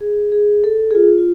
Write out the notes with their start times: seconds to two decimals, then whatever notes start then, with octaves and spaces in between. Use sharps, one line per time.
0.01 G#4
0.32 G#4
0.64 A4
0.91 G#4
0.95 F4
1.18 F4